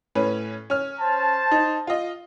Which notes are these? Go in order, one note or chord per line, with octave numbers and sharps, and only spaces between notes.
A2 C#4 B4
C#4 F6
C5 A5
D#4
F4 D#5